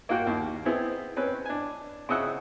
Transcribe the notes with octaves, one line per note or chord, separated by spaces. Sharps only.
A#3 F4 F#4 G5
D#2
B3 C4 E4 G#4
C4 C#4 B4
D4 G#5
C#3 C4 D#5 E5 F#5